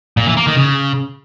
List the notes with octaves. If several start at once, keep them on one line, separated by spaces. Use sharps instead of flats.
A#2
E3
A#3
D#3
C#3